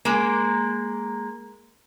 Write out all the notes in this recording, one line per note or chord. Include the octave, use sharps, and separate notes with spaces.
G#3 A#3